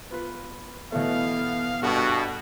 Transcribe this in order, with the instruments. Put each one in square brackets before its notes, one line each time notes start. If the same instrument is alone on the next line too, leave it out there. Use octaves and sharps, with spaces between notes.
[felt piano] B3 F4 B4
[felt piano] B2 E3 A3 [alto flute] B3 [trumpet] F5
[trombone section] G2 B2 [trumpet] F#4 [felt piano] A4